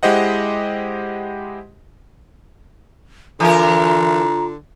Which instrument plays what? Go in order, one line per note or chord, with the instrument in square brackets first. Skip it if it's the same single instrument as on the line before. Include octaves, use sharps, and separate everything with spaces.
[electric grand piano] G#3 E4 G4 C5 D#5 F#5
[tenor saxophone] D3 [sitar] E3 A#4 [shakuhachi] F4 [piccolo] A#5